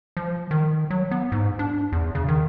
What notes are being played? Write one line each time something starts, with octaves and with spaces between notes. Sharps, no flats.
F3
D#3
F#3
B3
G#2
D4
E2
C#3
D#3